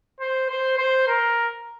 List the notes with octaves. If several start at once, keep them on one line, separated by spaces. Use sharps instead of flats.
C5
C5
C5
A#4